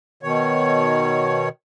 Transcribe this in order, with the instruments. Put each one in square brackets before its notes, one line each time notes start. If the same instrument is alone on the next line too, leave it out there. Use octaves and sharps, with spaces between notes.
[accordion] B2 D#3 C#5